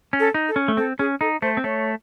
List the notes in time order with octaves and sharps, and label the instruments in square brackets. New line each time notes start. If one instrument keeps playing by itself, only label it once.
[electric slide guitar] C#4
[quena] A4
[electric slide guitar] D#4
[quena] A4
[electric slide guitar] C#4
A3
[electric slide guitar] C4 [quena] A4
[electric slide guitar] C#4 [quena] G#4
[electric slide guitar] D#4 [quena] A4
[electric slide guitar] A3 [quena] C5
[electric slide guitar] C4
[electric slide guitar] A3 [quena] C#5